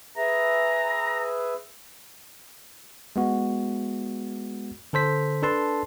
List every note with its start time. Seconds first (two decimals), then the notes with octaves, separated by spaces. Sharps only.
0.17 G#4 B4 E5 A#5
3.16 G#3 B3 F#4
4.93 D3 A4 C5 B6
5.42 D4 A4 B4 A5 C6